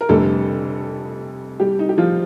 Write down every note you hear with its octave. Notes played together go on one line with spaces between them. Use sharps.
A#4
F1 F2 D3 G3 A3 A4
G3 G4
D#4
G4
F3 F4